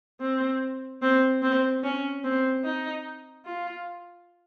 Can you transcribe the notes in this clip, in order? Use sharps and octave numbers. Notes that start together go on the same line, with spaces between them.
C4
C4
C4
C#4
C4
D#4
F4